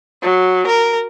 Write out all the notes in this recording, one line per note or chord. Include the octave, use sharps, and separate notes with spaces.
F#3
A#4